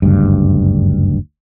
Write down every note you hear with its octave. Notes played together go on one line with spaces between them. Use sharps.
F#1 D2 G2